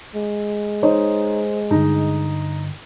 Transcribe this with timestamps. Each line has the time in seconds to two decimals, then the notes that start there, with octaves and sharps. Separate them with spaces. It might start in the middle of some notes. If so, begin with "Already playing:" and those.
0.15 G#3
0.83 D#4 C5 C#5 D#5
1.71 G2 D3 D#4